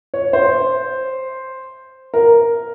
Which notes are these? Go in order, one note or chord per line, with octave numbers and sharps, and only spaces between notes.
C#5
C5
A#4